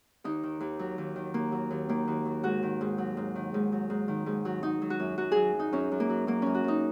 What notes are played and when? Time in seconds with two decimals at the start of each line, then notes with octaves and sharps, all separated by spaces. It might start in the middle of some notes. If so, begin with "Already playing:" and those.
0.24 D#2 D#4
0.43 D#3
0.60 D#2
0.79 F#3
0.98 D#2
1.16 D#3
1.34 D#2 A#3
1.52 F#3
1.71 D#2
1.89 D#3 A#3
2.08 D#2
2.25 F#3
2.43 G#2 F#4
2.63 D#3
2.81 G#2
2.98 F#3
3.17 G#2
3.35 D#3
3.54 G#2
3.72 F#3
3.90 G#2
4.08 D#3
4.26 G#2
4.45 F#3
4.63 F#3 D#4
4.82 F#3
4.90 F#4
5.00 F#2
5.18 F#2 F#4
5.32 F#3 G#4
5.55 F#3 D#4
5.73 F#2 C#4
5.92 F#2
6.00 A#3
6.09 F#3
6.27 F#3 A#3
6.42 F#2 C#4
6.55 F#4
6.64 F#2 D#4